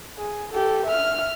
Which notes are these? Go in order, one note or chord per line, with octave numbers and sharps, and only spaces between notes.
G#4
G4 A4
E5 F6